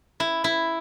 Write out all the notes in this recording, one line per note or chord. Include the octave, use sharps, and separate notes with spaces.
E4
E4